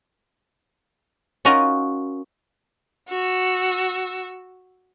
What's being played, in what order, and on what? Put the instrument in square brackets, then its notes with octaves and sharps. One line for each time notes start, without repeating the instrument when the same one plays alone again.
[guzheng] C#4 D#4 F4 F#4 A#4 D#5
[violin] F#4 E6